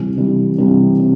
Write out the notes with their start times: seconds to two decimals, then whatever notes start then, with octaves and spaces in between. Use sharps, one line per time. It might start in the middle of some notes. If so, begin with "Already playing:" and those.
Already playing: C3 E3 G3
0.17 C3 E3 G3
0.58 C3 E3 G3
1.00 C3